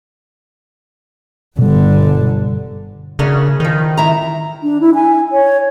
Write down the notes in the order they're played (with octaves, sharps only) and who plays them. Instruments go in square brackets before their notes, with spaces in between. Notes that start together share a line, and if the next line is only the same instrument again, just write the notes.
[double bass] G1 D3 [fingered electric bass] B2 G3
[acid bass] C#3 [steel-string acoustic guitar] A#3 D4 F#4
[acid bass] D#3 [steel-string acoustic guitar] F3 B4
[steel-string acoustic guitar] E4 A#5
[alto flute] D4
E4
G#5
C#5